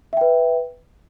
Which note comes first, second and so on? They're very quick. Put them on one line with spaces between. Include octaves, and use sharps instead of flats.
E5 G5 B4